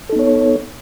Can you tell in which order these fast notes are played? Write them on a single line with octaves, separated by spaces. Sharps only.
A4 D#4 B3 C#5